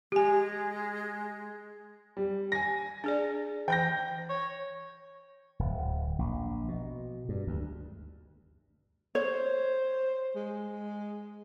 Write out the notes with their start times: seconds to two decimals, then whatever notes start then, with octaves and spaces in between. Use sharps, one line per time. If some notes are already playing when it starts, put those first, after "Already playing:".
0.12 G#3 G4 G#5
2.17 G3
2.52 G#5 A#6
3.04 D4 G#4 D5
3.68 E3 G5 G6 A#6
4.30 C#5
5.59 D1
5.78 D1
6.19 A#1
6.68 B2
7.29 G2
7.47 D2
9.15 C5 C#5
10.36 G#3